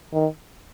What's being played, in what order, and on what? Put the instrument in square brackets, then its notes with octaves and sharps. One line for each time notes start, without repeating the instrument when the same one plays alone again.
[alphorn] D#3